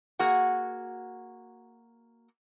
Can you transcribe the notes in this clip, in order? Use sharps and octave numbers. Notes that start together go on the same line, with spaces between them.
A#3 F#4 G#4 F#5